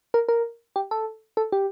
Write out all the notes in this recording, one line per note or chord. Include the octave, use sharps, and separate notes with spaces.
A#4
A#4
G4
A4
A4
G4